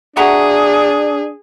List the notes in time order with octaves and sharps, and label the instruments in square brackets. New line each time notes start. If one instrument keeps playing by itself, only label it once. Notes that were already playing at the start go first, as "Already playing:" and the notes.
[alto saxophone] D4 [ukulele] F#4 E5 A#5 [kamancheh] G#4